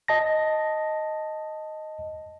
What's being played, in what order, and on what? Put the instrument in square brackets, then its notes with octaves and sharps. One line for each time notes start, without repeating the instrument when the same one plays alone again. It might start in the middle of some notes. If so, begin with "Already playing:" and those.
[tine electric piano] D#5 A5 A#6